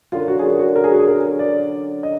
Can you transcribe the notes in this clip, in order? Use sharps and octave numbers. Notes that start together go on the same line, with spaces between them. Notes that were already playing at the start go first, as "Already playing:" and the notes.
F#2 D3 F#3 F4
F#4
G#4
F#4
F#4
A#4
G#4
F#4
G#4
A#4
D5
D#5